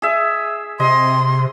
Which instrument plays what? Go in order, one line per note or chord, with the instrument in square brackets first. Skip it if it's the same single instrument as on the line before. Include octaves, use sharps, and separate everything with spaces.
[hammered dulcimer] G#4 E5
[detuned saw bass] C3 [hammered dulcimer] D#5 [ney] C6